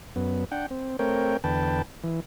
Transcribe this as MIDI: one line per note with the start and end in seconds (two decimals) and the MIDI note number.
0.16 0.45 42
0.16 0.45 59
0.52 0.66 62
0.52 0.66 78
0.52 0.66 79
0.70 0.97 60
0.99 1.37 57
0.99 1.37 60
0.99 1.37 70
0.99 1.37 73
0.99 1.37 79
1.44 1.82 40
1.44 1.82 50
1.44 1.82 71
1.44 1.82 79
1.44 1.82 81
2.04 2.20 52